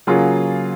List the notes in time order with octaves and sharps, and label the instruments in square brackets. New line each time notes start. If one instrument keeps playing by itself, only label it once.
[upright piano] C#3 F#3 A#3 F4 G#4